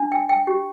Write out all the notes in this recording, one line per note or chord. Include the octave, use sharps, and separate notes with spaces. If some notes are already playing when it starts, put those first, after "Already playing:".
Already playing: D4
G5
G5
G4